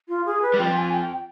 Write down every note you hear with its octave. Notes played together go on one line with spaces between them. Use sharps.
F4
G#4
B4
G3
F2 F3 G5
G#5
G5